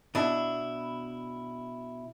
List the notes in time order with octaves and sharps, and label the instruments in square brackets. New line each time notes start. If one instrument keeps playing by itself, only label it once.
[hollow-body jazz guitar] B2 D4 E4